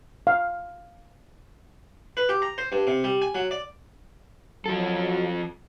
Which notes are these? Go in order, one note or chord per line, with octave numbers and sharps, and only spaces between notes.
F5
B4
G4
A#5
C5
G2
C3
G3
G#5
F#3
D5
F3 F#3 A4